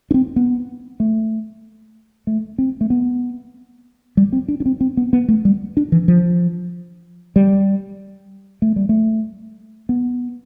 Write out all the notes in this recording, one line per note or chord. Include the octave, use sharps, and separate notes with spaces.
D4
C4
B3
A3
A3
C4
A3
B3
G3
C4
D4
D4
C4
C4
B3
B3
A3
G3
D4
E3
F3
G3
A3
G3
A3
B3